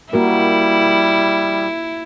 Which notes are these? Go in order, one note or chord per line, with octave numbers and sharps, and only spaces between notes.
G3 A#3 E4 F#4 A#4